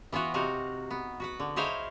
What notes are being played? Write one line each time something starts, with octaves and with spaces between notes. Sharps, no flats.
E3 B3 F4 F#4
C3 D#4 F#4 F5
B3
F#4 B4 F#5
D3
D#4 E4 G#4 C5 C#5 F5